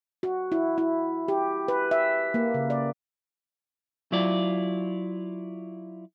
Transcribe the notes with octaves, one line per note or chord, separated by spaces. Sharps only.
F#4
E4
E4
G4
B4
E5
A#3
C#3
D5
F#3 E4 F4 D5